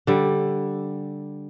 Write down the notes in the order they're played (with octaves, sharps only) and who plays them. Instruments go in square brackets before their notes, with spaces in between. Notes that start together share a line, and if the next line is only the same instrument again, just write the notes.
[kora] D3 G3